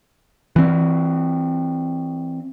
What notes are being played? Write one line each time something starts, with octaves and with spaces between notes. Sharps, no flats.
E3 C4